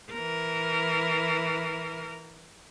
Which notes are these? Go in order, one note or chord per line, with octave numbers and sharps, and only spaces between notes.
E3 A#4